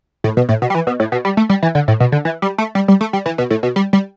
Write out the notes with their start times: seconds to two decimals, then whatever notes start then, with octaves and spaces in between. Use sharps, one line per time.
0.24 A2
0.37 B2
0.49 A2
0.62 B2
0.70 G3
0.75 E3
0.87 B2
1.00 A2
1.12 B2
1.25 G3
1.37 A3
1.50 G3
1.63 E3
1.75 D3
1.88 A2
2.00 B2
2.12 D3
2.25 E3
2.42 G3
2.58 A3
2.75 G3
2.88 G3
3.01 A3
3.13 G3
3.26 E3
3.38 B2
3.50 A2
3.63 B2
3.76 G3
3.93 G3